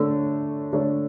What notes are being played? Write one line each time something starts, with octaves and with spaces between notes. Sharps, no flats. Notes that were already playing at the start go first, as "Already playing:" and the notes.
Already playing: D3 A3 D4 A4 C#5
D3 A3 D4 A4 C#5